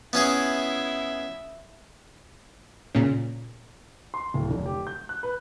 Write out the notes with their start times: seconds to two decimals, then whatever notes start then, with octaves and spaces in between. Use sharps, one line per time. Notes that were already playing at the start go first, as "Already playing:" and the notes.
0.13 B3 C#4 E4 G#4 E5
2.95 A#2 C#3
4.14 C6
4.34 D1
4.51 F1
4.66 G4
4.87 G6
5.09 F#6
5.23 B4